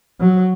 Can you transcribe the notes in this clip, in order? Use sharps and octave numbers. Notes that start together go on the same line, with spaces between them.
F#3